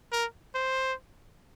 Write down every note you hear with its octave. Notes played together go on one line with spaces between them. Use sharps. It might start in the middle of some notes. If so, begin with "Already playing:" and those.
A#4
C5